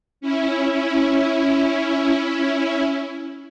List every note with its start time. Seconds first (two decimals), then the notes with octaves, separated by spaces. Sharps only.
0.21 C#4 E4
0.71 C#4 E4